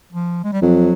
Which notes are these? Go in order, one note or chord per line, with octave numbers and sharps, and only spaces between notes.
F3
G#3
G3
F2 F#3